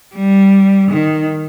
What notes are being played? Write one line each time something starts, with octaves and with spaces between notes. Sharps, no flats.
G3
D#3